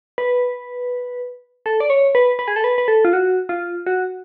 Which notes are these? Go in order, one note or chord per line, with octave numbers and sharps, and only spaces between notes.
B4
A4
D5
C#5
B4
B4
G#4
A4
B4
B4
A4
F4
F#4
F4
F#4